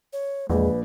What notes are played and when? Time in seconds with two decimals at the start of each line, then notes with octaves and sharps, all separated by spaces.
0.13 C#5
0.50 A#1 E2 G#3 B4